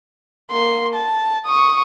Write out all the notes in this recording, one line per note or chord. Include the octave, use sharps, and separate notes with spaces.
A#3 C6
A5
C#6 D#6